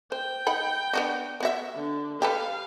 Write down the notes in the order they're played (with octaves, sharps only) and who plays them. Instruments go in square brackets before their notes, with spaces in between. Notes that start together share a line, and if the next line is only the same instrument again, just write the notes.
[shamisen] C5 [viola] G5
[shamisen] D#4 F#5 B5
B3 D4 F#4
B3 F#4 E5
[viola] D3
[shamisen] G4 A4 B4 [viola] F5